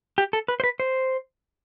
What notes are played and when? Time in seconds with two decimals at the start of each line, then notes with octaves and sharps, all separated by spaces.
0.18 G4
0.33 A4
0.48 B4
0.60 C5
0.64 B4
0.80 C5